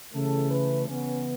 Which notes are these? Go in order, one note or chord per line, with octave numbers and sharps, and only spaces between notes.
C#3 E3 A3 A4
B4
C#3 E3 B3 C#4